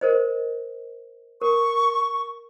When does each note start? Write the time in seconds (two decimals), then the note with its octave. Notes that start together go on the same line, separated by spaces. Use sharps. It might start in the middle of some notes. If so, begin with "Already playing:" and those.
0.01 A#4 C5 D#5
1.41 A#4 C#6